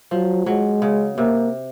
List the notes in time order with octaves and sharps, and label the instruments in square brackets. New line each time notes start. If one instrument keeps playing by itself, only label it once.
[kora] F3 [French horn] F#3
[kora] F#3 [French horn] G#3
[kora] C#3
[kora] C3 [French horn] A#3